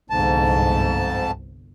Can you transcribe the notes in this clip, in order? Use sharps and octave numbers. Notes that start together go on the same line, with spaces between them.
G1 C2 F2 G#2 A5